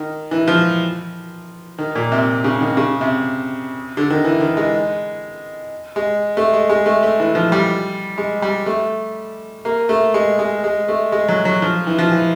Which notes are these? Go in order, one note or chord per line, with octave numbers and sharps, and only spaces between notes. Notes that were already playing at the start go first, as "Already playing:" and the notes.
Already playing: D#3
E3
F3
D#3
A#2
C3
C#3
D#3
C#3
C3
D3
D#3
E3
D#3
G#3
G#3
A3
G#3
G#3
A3
A3
E3
F3
G3
G#3
G3
A3
A#3
A3
G#3
G#3
G#3
A3
G#3
F#3
F#3
F3
E3
F3
E3